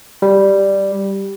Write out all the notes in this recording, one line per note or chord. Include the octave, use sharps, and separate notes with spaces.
G3